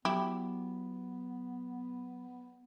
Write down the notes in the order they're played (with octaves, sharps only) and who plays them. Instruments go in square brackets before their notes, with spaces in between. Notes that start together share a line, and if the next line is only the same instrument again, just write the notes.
[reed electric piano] F#3 [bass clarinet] B3 [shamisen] E4 G4